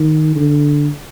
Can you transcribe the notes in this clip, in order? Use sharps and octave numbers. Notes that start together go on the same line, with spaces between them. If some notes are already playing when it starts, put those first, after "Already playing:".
Already playing: D#3
D3